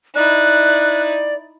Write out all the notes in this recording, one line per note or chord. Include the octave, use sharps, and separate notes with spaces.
D#4 E4 D5 F#6